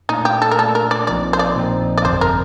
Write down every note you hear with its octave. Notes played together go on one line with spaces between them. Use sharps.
A#2 A3 D4 D#4
G4
A4
A#4
A#2 A3 D4 A4
A#4
D5
A#1 A#2 F3 C4 D#4 D5
C5
D5
A#1 A#2 F3 C4 D#4
D5
G1 F2 C3 C5
A#4